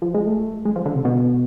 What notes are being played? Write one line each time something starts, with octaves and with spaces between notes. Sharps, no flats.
F3
G#3
A3
G#3
F3
D3
C3
B2